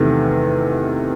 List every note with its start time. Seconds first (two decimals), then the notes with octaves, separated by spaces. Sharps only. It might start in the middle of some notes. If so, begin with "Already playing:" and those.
Already playing: E2 C3 D#3 A3